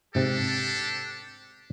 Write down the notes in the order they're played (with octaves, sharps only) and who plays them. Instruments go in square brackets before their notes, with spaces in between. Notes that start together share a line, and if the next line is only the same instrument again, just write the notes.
[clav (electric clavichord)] G#2 C3 [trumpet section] D4 G4 A4